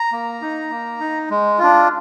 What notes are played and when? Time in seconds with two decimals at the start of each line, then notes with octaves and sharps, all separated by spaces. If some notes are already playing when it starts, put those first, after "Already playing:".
Already playing: A#5
0.12 A#3
0.41 D#4
0.70 A#3
1.00 D#4
1.30 G#3
1.59 D4 F4